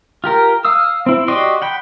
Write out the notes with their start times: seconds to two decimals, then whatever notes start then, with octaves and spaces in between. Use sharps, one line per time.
0.24 F4 G4 A#4
0.65 F5 D#6 E6
1.06 C4 E4
1.28 F#4 G4 D5 D#5 C6
1.62 F#5 G5 B5